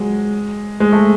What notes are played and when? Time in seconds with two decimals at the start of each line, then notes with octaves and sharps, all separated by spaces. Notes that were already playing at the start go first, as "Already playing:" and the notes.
Already playing: F#3 G#3
0.80 G#3
0.93 A3